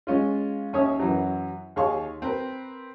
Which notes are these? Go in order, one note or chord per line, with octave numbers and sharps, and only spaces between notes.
G#3 C#4 F4
D#2 C#4 C#5 E5 D#6
F#2 E3 F#3
D#2 G#4 C#5 F5 C6 C#6
C4 A#4 B4